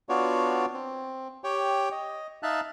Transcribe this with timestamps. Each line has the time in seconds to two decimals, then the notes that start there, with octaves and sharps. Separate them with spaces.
0.09 B3 D4 F4 F#4 C#5 D5
0.73 C4
1.44 G4 C#5 G5
1.92 D#5
2.43 D#4 E5 F5 A5 F#6